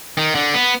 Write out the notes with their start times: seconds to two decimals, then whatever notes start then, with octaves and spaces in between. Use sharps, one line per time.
0.18 D#3
0.35 D3
0.54 B3